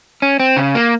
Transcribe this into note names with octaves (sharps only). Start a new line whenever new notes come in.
C#4
C4
C#3
A#3